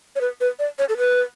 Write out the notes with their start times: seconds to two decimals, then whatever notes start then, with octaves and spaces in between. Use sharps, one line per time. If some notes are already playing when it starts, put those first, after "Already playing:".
0.16 C#5
0.21 B4
0.41 B4
0.59 D5
0.79 C#5
0.89 A4
0.98 B4